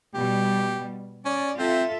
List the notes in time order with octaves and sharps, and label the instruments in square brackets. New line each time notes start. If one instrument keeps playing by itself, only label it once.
[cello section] B2 G3 [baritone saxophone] G4
[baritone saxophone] C#4 [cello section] D5
[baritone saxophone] C4 [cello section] F4 A4 E5